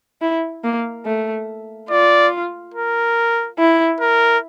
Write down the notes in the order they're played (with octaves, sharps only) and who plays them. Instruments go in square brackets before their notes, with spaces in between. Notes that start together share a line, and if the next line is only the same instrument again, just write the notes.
[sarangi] E4
A#3
A3
[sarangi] F4 [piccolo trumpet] D5
[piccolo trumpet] A#4
[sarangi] E4
[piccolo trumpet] A#4